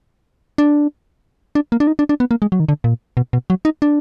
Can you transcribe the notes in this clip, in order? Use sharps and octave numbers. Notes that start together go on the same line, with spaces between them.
D4
D4
A#3
D4
D#4
D4
D4
B3
A#3
G#3
F#3
D#3
D3
A#2
B2
B2
F#3
D#4
D4